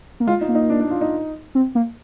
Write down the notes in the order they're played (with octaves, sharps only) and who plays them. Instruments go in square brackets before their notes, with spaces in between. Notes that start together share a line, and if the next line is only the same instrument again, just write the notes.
[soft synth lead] A#3
[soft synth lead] G#3 [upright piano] F4
[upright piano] D#4
[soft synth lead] A#3
[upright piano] D#4
D4
D4
F4
D#4
[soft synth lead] C4
A#3